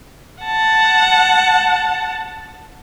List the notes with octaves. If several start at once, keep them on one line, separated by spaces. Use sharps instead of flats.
F#5 A5